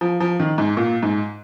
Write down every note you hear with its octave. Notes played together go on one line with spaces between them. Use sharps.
F3
F3
D#3
G#2
A#2
G#2